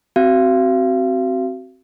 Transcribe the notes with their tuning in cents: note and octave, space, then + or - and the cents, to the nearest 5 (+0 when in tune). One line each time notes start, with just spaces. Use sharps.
C4 +0 F#4 +25 F5 -35